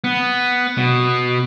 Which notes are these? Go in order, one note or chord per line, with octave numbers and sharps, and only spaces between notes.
B3
B2